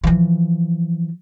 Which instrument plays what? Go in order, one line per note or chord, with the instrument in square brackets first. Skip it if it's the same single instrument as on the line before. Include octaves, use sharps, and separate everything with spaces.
[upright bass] E3 F3